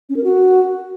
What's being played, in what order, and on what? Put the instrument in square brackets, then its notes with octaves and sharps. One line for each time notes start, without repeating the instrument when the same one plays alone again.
[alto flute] C#4
A#4
F#4